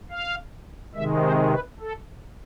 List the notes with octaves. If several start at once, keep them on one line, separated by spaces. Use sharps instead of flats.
F5
C3 D#3 G#3 E5
C5
B4
A4